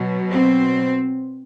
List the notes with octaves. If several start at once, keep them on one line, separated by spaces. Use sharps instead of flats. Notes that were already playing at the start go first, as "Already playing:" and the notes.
Already playing: B2 F#3
C4